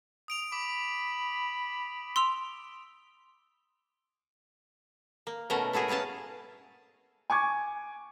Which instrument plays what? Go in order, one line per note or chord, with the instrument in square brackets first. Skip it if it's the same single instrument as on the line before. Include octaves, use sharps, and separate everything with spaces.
[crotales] D#6 D7 F7
[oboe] B5 [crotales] D6
[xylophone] C6 E6 F7
[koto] A#3
B2 A3 C#4 E4 F#4 A#4
A3 E4 F#4 G#4 A#4
A#3 B3 C#4 F5 A5
[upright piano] G#5 C#6 D6 G#6